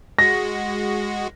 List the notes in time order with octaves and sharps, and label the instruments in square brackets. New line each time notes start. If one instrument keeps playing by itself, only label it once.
[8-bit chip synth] G#3 F#4 [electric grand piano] A#6